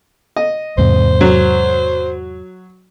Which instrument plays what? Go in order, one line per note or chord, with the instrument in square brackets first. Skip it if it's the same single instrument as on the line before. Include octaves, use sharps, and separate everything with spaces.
[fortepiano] D#5
[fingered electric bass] E2 G#2 C3 [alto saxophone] C5
[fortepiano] F#3